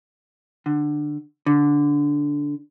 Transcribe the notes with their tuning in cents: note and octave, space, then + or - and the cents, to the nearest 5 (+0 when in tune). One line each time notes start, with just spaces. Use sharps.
D3 +15
D3 -10